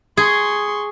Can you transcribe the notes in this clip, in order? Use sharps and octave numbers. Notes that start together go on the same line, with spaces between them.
G#4 C6 C#6